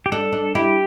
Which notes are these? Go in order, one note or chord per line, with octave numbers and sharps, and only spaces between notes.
G4
D4 A4
D4
E4 G4